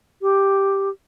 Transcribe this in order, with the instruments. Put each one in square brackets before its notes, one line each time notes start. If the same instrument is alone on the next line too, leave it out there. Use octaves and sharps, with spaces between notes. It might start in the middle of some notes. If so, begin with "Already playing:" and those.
[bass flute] G4